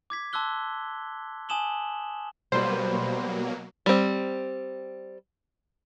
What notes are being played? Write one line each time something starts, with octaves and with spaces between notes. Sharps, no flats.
D6 G#6 B6
A5 C6 D6 E6 F#6 G7
G#5 A5 D#6 E7 F#7 G7
B2 F#3 G3 A#3 B3 B4 C5
G3 C4